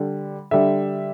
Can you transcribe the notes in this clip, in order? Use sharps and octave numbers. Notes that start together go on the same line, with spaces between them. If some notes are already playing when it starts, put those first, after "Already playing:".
Already playing: D3 G3
D3 G3 E5